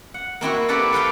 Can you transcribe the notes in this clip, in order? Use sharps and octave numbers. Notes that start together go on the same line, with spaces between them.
F#5
A#3 C4 E4 F#4
G4 A4 B4 D5 F#5 A5
A4 B4 F5 G5